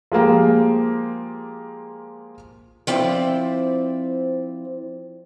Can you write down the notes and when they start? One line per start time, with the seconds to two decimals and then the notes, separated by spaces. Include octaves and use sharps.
0.12 F3 G#3 A#3 G4
2.87 F3 C4 E4 D5 E5